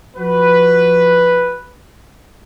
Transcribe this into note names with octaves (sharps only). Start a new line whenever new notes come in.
F3 F#4 B4